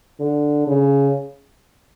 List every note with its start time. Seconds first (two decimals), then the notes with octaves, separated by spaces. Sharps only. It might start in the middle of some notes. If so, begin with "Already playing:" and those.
0.20 D3
0.67 C#3